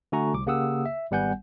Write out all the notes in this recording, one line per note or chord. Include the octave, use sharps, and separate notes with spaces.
D3 A3 F#4 G#5 A#5 C#6
C2 D6
C#3 A#3 G4 F#5 D#6 E6
E5
G#1 G3 B3 F#5 G#5 G6